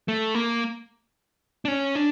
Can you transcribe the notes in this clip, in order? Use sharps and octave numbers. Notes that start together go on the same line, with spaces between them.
A3
A#3
D4
C#4
D4